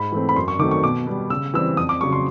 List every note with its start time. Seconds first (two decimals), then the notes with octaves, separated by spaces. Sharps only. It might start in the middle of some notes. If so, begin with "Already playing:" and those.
Already playing: G#2 B5
0.12 E3 A3 C4
0.29 B5
0.36 F#2 C6
0.48 C#6
0.59 D#3 F#3 A3 C4 D6
0.71 C#6
0.83 B2 D6
1.07 G3 B3
1.30 C#3 E6
1.54 E3 G3 C4 E6
1.77 F2 D#6
1.89 D6
2.01 C#3 F#3 C#6
2.13 C6